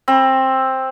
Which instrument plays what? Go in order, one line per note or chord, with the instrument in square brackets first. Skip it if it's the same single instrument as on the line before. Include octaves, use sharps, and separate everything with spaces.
[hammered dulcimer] C4